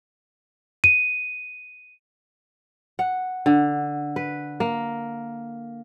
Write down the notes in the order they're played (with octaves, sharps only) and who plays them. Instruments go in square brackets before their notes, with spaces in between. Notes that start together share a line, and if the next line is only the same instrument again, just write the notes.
[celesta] D#7
[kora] F#5
D3
B4
A#3